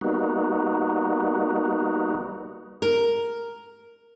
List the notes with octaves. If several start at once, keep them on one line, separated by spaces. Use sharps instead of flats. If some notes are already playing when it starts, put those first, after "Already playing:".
G3 A#3 B3 D#4 F#4
A#4